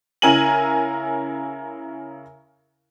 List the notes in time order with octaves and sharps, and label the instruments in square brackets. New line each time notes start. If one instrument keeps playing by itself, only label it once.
[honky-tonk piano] C#3 E4 A#4 G#5 D#7 F#7